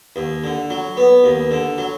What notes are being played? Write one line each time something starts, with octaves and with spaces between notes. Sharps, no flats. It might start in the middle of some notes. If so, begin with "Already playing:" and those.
D#2
D3
F#3
B3
D#2
D3
F#3